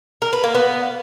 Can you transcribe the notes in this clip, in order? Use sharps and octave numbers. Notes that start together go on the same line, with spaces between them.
A#4
B4
A#3
B3